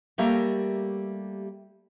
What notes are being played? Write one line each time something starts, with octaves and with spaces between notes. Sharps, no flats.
G3 A3 A#3 G4 E5 A#5